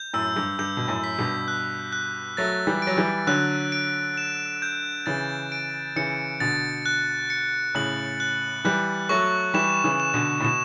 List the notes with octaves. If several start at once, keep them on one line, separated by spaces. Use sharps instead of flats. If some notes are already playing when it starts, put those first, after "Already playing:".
Already playing: G6
F#2 A2 E6
G2
G2 G6
B2
F#2 A2
B6
G2 B2
F#6
F#6
F#3 A3 A6
E3 G3
F#3 D7
E3 G3
D3 F#3 F#6
D7
E7
G6
C#3 E3 A6
D7
C#3 E3 C#7
B2 D3 A6
F#6
C#7
A2 C#3 F#7
F#6
E3 G3 F#6
F#3 A3 C#6
E3 G3 E7
C#3 E3
E7
B2 D3
A2
B2 E7